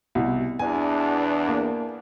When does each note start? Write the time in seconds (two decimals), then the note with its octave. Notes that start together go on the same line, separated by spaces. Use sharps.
0.15 C2 B2
0.59 E2 D4 G#5
1.48 A#3